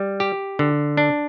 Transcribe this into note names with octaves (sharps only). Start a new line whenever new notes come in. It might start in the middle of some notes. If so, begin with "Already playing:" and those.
Already playing: G3
G4
D3
D4